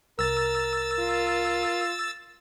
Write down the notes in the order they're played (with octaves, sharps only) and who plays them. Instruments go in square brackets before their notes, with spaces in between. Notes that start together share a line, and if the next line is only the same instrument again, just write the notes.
[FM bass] C2 [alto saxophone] A#4 [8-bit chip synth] E6 A6
[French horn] F4